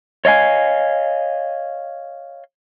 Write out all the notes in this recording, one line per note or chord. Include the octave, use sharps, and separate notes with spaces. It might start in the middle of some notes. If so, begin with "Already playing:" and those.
C#5 D#5 F5 G#5